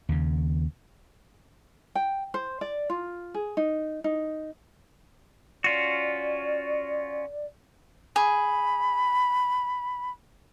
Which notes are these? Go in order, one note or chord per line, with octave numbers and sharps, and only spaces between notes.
D#2 C#3
G5
C5
D5
F4
G#4
D#4
D#4
C#4 F4 F#4 D5
G#4 B5